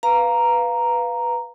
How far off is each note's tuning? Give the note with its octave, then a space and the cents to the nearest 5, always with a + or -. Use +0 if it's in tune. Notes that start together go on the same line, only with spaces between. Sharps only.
B4 +0 F5 +0 A#5 +0